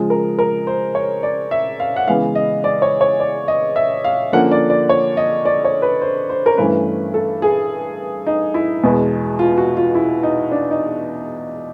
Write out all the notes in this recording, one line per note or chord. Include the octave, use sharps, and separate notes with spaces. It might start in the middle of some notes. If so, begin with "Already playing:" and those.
Already playing: C#3 F3 G#3
A#4
A#4
C5
C#5
D5
E5
F5
F#5
C#3 E3 G#3 B3 F5
D#5
D5
C#5
C#5
D5
D#5
E5
F5
D3 F3 A#3 C#4 F#5
D5
D5
C#5
D#5
D5
C#5
B4
C5
C5
A#4
G2 E3 A3 C#4 B4
A4
G#4
D#4
E4
E2 B2 G#3 B3
F4
F#4
F4
E4
D#4
D4
D#4